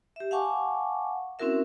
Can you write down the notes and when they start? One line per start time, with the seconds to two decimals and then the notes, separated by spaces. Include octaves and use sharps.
0.16 G4 E5
0.31 F5 F#5 G#5 A5 C#6 D6
1.39 C4 C#4 E4 F#4 A#4 E5